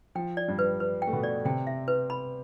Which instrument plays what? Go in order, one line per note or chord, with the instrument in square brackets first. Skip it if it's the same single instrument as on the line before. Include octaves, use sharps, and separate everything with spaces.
[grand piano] F3 [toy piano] G5
[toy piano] D5
[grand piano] G2 G3
[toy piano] B4
B4
G5
[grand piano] A3
B2 B3
[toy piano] D5
[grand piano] C3 C4 [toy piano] G5
[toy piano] E5
B4
B5